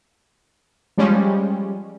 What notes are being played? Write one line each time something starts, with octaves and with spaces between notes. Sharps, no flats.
F3 G3 G#3 C#4